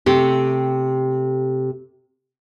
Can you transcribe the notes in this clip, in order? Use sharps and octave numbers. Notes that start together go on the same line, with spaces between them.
C3 A3 G4